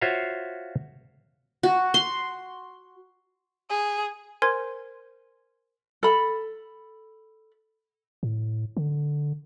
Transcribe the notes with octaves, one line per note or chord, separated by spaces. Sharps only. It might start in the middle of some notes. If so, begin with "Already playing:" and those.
F4 F#4 C5 C#5 E5 F5
F#4
C6
G#4
A#4 C5 G#5 C6 G#6
A4 B5
A2
D3